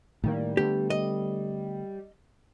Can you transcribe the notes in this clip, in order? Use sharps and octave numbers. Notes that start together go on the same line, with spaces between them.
A2 D#3 G3 A#3
D3 A3 B3 G4
D#5